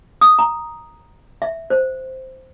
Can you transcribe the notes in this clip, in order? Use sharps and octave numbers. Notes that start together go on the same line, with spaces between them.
D#6
A#5
E5
C5